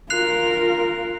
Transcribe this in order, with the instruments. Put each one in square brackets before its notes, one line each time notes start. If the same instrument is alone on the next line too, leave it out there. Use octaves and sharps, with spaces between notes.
[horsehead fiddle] F4 A#4 [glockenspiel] F#6 C7 F7